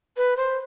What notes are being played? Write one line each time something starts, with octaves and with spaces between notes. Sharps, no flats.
B4
C5